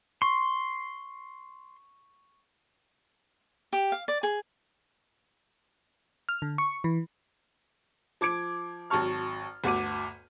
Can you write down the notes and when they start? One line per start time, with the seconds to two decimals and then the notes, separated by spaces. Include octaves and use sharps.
0.22 C6 C#6
3.73 G4
3.92 F5
4.08 D5
4.23 G#4
6.29 F6
6.42 D3
6.58 C#6
6.84 E3
8.21 F3 D6 G#6 D7
8.90 G#1 F#3 A5 C#6 F6
9.64 G1 D2 F#4 D6 D#7